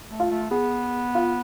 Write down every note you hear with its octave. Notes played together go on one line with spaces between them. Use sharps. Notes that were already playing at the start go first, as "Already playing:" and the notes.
A3
F4
A3
B3 G#4
F4